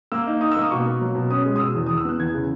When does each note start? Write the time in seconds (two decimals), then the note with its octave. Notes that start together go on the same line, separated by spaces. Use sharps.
0.12 A#3 E6
0.27 D#4
0.41 D#4 D#6
0.52 E6
0.57 A#3 D#6
0.71 B2 C#6
0.86 A#3
1.01 F#3
1.15 B2
1.30 C#4 D#6
1.46 G#3
1.56 D#6
1.60 B2 E6
1.75 E2
1.87 E2 D#6
1.97 E6
2.05 B3 F#6
2.20 E2 G#6
2.34 C#3